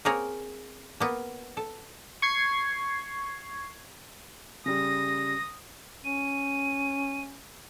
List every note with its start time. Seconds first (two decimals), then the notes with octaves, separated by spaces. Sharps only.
0.05 A#3 C4 G#4 A#4 C#5
1.00 A#3 B3
1.57 A4
2.22 C#6 G#6 C7
4.66 C#3 G3 D#6 A#6
6.05 C#4 D#7